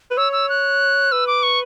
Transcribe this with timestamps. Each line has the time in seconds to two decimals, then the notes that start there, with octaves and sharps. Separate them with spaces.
0.11 B4
0.17 C#5 E6
0.32 E6
0.49 F#6
1.12 B4 E6
1.27 D6
1.43 C#6